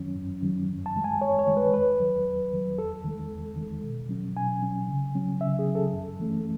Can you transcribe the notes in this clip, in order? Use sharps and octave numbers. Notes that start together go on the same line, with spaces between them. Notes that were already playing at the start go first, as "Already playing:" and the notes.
Already playing: F#2 D#3 F#3 C#4
F#2
D#3 F#3 C#4
F#2
A5
D#3 G#3
G#5
F#2 C#5
C#5
D#3 G#3
B4
E2 B4
D#3 F#3
E2
D#3 F#3
E2 A4
D#3 G#3
E2
D#3 G#3
B2
F#3 C#4
B2 G#5
F#3 C#4
C#3
F#3 C#4
C#3 E5
G#4
F#3 C#4
A4
F#2
E3 A3 C#4